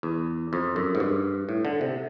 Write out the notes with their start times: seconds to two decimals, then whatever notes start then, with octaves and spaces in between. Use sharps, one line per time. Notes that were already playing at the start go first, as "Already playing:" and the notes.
0.03 E2
0.53 F2
0.76 F#2
0.95 G#2
1.00 G2
1.49 A2
1.65 D3
1.81 C3